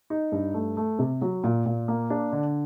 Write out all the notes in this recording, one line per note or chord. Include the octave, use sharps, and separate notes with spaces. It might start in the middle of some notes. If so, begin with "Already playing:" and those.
D#4
G2
A3
A3
C3
F#3
A#2
A#2
A#3
D4
D3